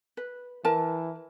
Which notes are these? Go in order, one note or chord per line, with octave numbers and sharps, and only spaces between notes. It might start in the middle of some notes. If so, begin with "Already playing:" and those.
B4
E3 A#4 A5